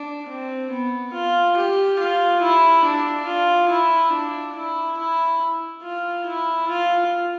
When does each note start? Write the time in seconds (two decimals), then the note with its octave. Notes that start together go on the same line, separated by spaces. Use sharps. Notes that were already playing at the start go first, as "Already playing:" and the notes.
Already playing: D4
0.28 C4
0.71 B3
1.13 F4
1.57 G4
1.99 F4
2.42 E4
2.85 D4
3.26 F4
3.69 E4
4.13 D4
4.56 E4
4.98 E4
5.83 F4
6.26 E4
6.69 F4